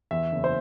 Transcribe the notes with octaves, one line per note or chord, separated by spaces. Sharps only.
E2 E5
F#1
C5